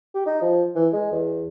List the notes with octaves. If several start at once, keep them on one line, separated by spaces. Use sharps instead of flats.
G4
D#4
F3
E3
G#3
E2